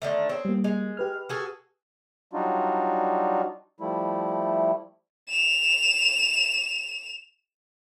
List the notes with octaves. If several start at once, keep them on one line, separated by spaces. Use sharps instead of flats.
D3 D#3 A3
C4 G#4 C#5
G3 A#3
G#3
G4 B4 F6
F#4 G#4 A4
F#3 G3 D4 D#4 F4 F#4
F3 G3 A3 E4
E7 F7